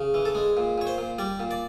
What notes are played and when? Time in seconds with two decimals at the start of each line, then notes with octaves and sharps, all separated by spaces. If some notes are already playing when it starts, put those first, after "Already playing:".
Already playing: C#3
0.14 E3
0.25 A4
0.35 G#3
0.57 A#2
0.78 A#2 C#5
0.87 C5
0.98 A#2
1.19 G3 D5
1.40 A#2
1.51 D5